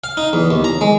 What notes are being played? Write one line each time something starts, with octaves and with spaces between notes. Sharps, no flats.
F5
D#4
E2
D#2
A#5
G#3